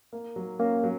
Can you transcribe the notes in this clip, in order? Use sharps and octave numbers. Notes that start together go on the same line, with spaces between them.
A#3
F#3
A#3 C#4
F#3